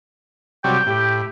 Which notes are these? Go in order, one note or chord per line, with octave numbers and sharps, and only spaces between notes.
C3 F#3 G3 G5
A2 G4